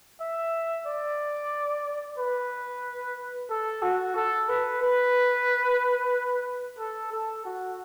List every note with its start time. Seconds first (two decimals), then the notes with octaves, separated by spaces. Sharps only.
0.20 E5
0.86 D5
2.18 B4
3.50 A4
3.82 F#4
4.16 A4
4.49 B4
4.82 B4
6.79 A4
7.12 A4
7.45 F#4